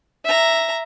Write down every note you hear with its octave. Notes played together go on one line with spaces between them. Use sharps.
E5 A#5